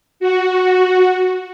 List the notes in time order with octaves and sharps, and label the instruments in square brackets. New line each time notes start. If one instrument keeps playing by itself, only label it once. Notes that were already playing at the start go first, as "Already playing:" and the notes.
[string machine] F#4